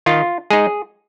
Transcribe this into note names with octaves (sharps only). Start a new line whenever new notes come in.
D#3 F4
G#3 D#4 G#4